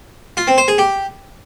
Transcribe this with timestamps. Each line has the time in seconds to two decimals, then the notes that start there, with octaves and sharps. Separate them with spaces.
0.37 F4
0.47 C4
0.58 C5
0.68 G#4
0.78 G4